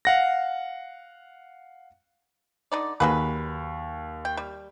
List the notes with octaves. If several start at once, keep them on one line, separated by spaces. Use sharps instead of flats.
F5 F#5 A#6
D3 D#4 D5
D#2 F#3 G#4 B4
G5
G3